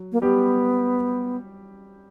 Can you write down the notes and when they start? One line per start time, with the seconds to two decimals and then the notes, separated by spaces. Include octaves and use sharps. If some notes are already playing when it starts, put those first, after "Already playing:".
Already playing: F#3
0.12 A#3
0.21 G3 B3 G4